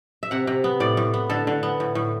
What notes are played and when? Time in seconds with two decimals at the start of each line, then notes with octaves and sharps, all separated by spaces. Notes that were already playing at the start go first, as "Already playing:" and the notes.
0.23 E5
0.31 C3 F#5
0.47 C3
0.64 B3
0.80 A2 D5
0.97 A2
1.14 B3
1.30 D3 A4
1.47 D3
1.63 B3
1.80 A2
1.95 A2